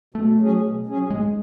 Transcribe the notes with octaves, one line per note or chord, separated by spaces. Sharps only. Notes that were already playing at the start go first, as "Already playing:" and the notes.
B2 A3
F#3 C#4 G#4
B2
F#3 C#4 G#4
G#2 G#3